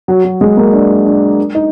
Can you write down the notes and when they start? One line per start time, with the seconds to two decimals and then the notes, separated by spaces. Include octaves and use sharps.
0.08 F#3
0.24 F#3
0.41 G#3
0.57 A#3
0.72 D4
1.05 D4
1.55 D#4